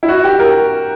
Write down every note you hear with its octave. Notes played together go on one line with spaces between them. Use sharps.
E4
F#4
G4
A#4